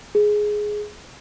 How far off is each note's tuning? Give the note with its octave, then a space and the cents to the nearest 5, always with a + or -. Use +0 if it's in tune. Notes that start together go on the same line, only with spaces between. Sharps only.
G#4 +10